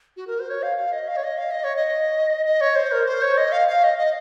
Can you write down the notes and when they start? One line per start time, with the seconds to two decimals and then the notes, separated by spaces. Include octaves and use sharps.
0.17 F#4
0.27 A#4
0.40 C5
0.50 C#5
0.63 F5
0.78 F5
0.92 D#5
1.08 F5
1.16 C#5
1.24 D#5
1.38 F5
1.51 D#5
1.64 C#5
1.76 D#5
2.46 D#5
2.61 C#5
2.76 C5
2.92 A#4
3.06 C5
3.22 C#5
3.37 D#5
3.52 F5
3.68 F5
3.83 D#5
3.98 D#5